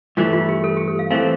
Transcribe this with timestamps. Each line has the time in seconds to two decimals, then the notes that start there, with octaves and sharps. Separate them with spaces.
0.17 G2 E3 A3 E4 F4
0.33 F4
0.49 G4
0.64 A4
0.77 G4
0.88 A4
0.99 F5
1.11 A2 E3 A3 C4 F5